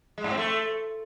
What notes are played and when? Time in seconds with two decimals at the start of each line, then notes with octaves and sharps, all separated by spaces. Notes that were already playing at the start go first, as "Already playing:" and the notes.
0.18 G#3
0.24 G#2
0.31 C4
0.38 A3